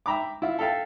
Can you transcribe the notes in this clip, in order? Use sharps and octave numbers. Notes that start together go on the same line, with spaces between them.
E5 G5 A#5 B5 D6
E4 F4 E5
A4 E5 F5 G5 A5